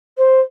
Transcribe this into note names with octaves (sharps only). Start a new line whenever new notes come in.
C5